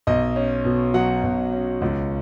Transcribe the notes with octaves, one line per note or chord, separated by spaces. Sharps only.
B1 D#5
C#4
B2
F#3 F#5
B1
C#4
C#2